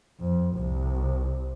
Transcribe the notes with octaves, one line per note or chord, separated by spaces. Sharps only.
F2
C2